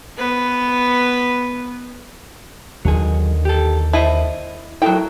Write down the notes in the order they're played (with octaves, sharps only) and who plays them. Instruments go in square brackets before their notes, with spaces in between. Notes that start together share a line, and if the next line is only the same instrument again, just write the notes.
[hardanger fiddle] B3 B4
[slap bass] D#2 D3 D#3 [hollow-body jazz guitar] F#3 G#4
[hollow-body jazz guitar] G4 A4
[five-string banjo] E4 [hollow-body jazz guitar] C5 D#5 A5
[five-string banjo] F#3 G5 [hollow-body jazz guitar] E4 A4 A#4